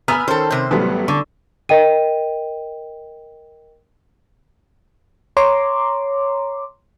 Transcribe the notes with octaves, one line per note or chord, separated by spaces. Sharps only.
B3 B4 G#5 A#5 B5 E6 F6
D#3 C#4 A4 C5
C3 C5
A1 F#3 G3 B3 A4
D3 C#6
A#4 D#5 G5 D#7
C#5 A#5 C6 D6